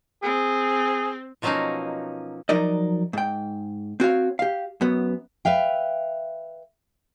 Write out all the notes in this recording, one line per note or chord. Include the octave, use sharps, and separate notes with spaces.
C4 G#4
B2 F3 F#3 A#3 C#4 D#4
F3 F#3 D#4 A#4 D5 D#5
G#2 G5
C4 F#4 C#5 F5
G4 F5
F#2 B3
B4 E5 F5 G5